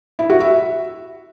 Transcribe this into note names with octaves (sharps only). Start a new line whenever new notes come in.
E4
F#4
E5